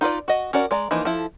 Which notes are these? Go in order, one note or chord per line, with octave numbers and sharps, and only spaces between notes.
D#4 F4 B4 D5
F#4 D#5
C#4 F#4 A#4 D5
G#3 D5 A#5
E3 F3 A#3 D#4
F3 E4 A4